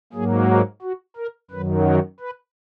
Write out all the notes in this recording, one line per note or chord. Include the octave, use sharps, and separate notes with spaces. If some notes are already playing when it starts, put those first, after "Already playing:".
G#2 F#3 A#3 G#4
F#4
F#4
A#4
F#2 D#3 F#3 B4
A#4
B4